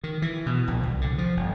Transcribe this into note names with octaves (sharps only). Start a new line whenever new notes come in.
D#3
E3
B2
A#1
C2
D3
F3
G1